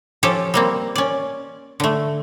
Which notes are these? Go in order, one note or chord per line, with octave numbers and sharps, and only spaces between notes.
F3 C#4 G4 A4
G3 A#3 C4
C#4 D5
D3 A3